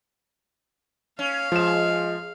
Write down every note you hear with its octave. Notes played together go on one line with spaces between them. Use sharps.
C#4 F5
F3 G#3 E7